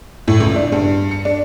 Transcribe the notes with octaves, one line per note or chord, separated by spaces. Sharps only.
A2
C#2
D4
G2
C#7
D4